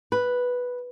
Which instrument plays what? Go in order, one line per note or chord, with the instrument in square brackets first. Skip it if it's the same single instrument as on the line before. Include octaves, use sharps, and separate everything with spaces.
[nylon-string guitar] B4